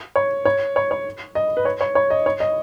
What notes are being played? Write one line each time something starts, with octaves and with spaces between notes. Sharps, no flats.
C#5
C#5
C#5
C#5
D#5
B4
C#5
C#5
C#5
D#5
C#5
D#5